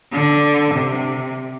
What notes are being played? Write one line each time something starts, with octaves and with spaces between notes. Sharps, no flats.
D3
C3